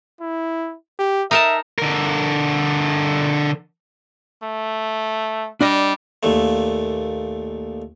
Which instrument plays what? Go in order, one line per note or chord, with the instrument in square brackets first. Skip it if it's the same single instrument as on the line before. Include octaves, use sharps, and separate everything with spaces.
[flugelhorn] E4
G4
[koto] D#4 A#4 A5 [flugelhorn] E5
[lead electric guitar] D3 A#4
[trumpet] A3
[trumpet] G3 [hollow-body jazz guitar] D4 D5 D#5
[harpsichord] D#2 A#2 A3